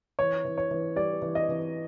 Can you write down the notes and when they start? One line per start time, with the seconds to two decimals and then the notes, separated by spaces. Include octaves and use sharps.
0.19 E3 C#5
0.45 E3
0.58 C#5
0.71 E3
0.96 G3 D5
1.22 E3
1.35 D#5
1.49 E3